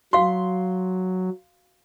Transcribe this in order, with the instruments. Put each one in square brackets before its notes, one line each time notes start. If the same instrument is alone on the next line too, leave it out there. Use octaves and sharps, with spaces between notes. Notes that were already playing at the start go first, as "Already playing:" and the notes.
[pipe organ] F#3 [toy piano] F#4 F5 [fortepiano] C6